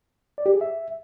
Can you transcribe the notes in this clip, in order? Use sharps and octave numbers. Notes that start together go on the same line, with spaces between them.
D5
G4
G#4
E5